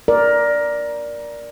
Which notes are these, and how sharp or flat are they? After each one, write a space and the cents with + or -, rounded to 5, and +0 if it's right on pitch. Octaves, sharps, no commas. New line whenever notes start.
A#4 +15 D5 +0